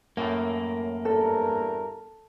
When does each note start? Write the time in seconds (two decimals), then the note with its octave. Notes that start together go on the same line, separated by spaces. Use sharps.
0.17 F#2 A2 A3 A#3
1.05 E2 G2 A4 A#4